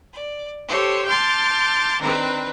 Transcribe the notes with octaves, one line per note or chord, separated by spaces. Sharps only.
D5
G4 A4 C5 C#5 C6
A5 C6 D6 F6 G6
D#3 C4 D4 A#4 B4